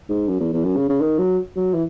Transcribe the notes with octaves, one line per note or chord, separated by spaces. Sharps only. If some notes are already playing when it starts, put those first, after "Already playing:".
G#2
F#2
E2
E2
F#2
C#3
C#3
D#3
F#3
F#3
E3